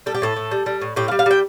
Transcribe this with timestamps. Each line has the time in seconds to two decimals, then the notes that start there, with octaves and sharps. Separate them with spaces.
0.06 G3 A4
0.15 G4
0.22 A2 A4
0.36 A2
0.51 G3
0.66 G3
0.81 A2
0.96 A2 G4
1.08 F5
1.11 G3
1.19 F5
1.26 G3 G5